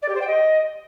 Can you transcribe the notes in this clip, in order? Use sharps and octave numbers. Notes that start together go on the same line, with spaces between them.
D5
G4
C5
G5
D#5